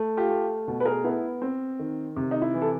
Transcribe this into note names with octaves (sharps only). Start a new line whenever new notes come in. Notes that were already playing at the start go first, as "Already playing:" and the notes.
Already playing: A3
F4 G4
A3
B2
B4
G#4 A#4
B3 E4
C4
D#3
C3
D#4
E4
E3
A4